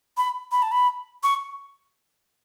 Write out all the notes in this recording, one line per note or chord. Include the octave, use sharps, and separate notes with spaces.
B5
B5
A5
B5
C#6